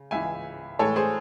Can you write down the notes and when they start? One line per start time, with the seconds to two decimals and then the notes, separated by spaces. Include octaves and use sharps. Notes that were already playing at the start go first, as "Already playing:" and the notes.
Already playing: C#3
0.11 C#2 C#3 E3 E5 G#5
0.79 A2 E3 G#3 A4 C#5
0.96 G#4 C5